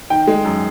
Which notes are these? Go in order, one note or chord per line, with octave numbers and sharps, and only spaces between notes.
D#3 G5
G#3
F#2